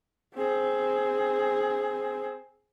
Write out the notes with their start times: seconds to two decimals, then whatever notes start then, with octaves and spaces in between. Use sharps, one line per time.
0.35 C4 G#4